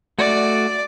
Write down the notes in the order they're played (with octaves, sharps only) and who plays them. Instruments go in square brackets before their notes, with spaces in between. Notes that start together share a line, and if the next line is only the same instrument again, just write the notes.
[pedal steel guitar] A3 F#4 [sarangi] D5